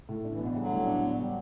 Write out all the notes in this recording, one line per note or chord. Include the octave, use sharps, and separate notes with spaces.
A2
D4
E3
B2 D3 B3
C#3 E3
G3
D3 F#3
A2
D4
B3
G3